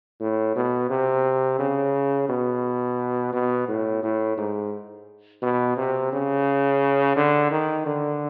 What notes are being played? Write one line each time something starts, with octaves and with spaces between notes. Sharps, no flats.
A2
B2
C3
C#3
B2
B2
A2
A2
G#2
B2
C3
C#3
D3
D#3
D3